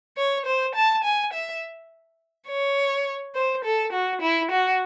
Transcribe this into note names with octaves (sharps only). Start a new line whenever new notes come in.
C#5
C5
A5
G#5
E5
C#5
C5
A4
F#4
E4
F#4